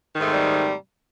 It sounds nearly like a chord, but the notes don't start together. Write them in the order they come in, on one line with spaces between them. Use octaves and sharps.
D#3 G#2 A3 C3 G3